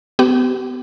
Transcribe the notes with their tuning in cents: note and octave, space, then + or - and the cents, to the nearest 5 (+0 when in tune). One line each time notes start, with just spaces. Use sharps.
B3 +30 G4 -35